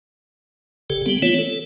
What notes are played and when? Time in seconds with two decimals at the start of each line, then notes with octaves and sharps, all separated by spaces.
0.90 G1 C#3 G4 A4
1.06 G3 B3 C4
1.22 E3 A3 B3 C4 F4 C#5
1.39 A4